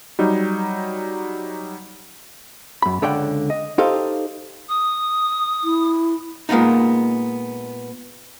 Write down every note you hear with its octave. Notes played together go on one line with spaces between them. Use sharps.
F#3 G3 D#4
F#2 B5
C#2 D3 C#5 D5 F#5 G5
D#5
D#4 G4 A4 C5 D#5 F5
D#6
E4
A#2 G#3 A#3 B3 D#4